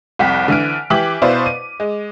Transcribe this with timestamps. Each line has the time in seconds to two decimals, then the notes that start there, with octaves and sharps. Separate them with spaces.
0.19 C2 F2 F#5 G5 B6
0.48 D3 E3 F6 D7
0.90 E3 G4 D6 B6 F#7
1.22 B2 E4 B4 C5 D5 F5
1.46 D#7
1.80 G#3